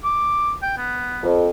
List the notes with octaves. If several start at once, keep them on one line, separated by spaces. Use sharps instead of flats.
D6
G5
B3
F2